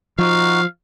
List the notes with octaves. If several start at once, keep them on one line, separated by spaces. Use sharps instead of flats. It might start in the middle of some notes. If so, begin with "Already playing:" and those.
F3 D#4 F#4 F5 F#5